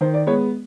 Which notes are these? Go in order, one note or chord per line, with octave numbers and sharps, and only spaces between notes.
D#3 C5
D5
G#3 B3 C#5